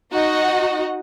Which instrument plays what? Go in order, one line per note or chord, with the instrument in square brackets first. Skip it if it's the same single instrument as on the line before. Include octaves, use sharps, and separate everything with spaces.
[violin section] D#4 F#4 D#5